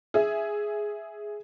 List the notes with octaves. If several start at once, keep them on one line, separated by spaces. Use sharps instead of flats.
G#4 E5